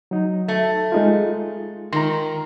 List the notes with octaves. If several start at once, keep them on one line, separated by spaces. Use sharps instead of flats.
F#3 D#4
A3
G#3 D#4 F4
D#3 A#5 C6